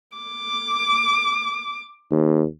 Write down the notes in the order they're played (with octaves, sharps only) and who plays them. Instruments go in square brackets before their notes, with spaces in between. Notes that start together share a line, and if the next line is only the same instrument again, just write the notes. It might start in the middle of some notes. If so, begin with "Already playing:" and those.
[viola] D6
[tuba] D#2